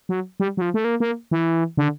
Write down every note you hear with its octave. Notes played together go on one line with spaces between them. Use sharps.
F#3
G3
F#3
F3
A3
A#3
A#3
E3
D3